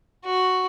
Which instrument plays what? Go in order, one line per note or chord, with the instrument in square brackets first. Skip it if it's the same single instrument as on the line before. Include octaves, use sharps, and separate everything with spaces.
[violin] F#4